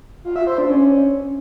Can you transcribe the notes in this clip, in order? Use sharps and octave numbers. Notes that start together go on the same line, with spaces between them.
F4
E5
C5
D4
C#4